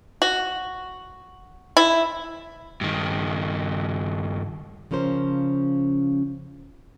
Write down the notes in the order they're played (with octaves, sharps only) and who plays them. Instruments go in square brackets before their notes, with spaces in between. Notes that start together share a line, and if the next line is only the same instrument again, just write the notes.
[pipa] F#4
E4
[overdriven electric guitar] G2 D#3
[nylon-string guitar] C#3 F3 C#4 A#4 C5